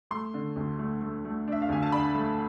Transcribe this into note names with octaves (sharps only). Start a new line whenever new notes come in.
A3 C6
D3
D2
A3
A3
A3
D4 E5
F5
D2 G#5
A5
D4 B5
A3